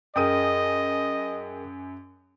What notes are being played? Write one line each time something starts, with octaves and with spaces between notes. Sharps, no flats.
F#2 G#4 A#4 D#5 G5 D#6 D#7